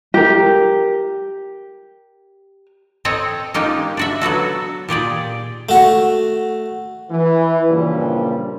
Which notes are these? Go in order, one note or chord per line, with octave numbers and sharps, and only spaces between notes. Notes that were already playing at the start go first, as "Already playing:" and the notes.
G4 A#4
C4 A4 C#5 D#5
G#3 A#3 C#4 D#4 F4 G4
D4 F#4 E5
F#3 B3 F#4 A4
A#2 G4 G#4 D5
A3 F#4
E3
G2 A#2 C#3 F3 G3